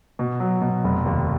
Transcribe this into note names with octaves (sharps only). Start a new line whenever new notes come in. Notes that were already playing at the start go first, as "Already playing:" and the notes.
B2
F#3
B2
F1
D#2